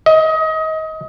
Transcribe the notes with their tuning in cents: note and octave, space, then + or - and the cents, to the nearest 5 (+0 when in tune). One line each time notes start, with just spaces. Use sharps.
D#5 +30